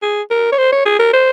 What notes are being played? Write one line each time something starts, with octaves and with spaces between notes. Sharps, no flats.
G#4
A#4
C#5
C5
C#5
G#4
A#4
C5